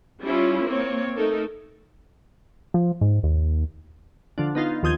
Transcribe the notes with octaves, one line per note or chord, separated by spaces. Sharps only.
G3 C#4 E4 F4
A#3 C4 C#5
A3 D#4 A4 A#4
F3
G#2
D#2
D3 F3 D4
B3 D#4 F4
D#2 F3 D#6 G6 G#6